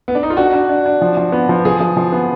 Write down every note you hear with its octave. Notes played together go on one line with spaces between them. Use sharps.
B3
D4
D#4
F4
D4 F#4
D4
D4
D4
F3
F3
B3
F3
F3 G#4
F3
F3
B3